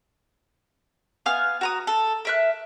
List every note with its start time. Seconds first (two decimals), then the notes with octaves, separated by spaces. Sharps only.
1.26 B3 F5 G#5 F6
1.61 F#4 A#5 D#6
1.87 A4
2.25 A#4 E5 F#6